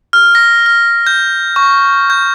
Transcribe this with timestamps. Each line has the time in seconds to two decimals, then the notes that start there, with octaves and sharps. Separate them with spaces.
0.13 F6
0.35 A#6
0.66 F6
1.07 G6
1.56 C#6
2.10 G6